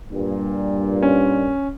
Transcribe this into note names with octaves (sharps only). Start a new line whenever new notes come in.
G2 A#2
C#4